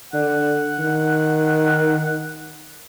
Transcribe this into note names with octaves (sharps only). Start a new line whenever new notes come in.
D3 F#5
D#3